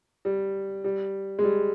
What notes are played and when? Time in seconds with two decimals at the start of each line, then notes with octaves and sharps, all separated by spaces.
0.25 G3
0.84 G3
1.39 G#3
1.43 G3